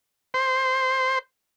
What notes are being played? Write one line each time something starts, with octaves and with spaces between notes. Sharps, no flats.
C5